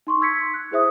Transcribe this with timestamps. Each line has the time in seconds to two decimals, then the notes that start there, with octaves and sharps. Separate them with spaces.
0.07 D#4 C6 C#6
0.21 E6 G#6 B6 C#7
0.54 F#6
0.71 E4 G#4 C5 E5 D#6